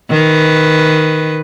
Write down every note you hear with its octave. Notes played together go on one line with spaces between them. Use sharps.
D#3 B4